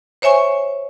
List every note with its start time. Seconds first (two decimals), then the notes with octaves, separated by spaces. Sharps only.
0.22 C5 C#5 E5 G#5 C#6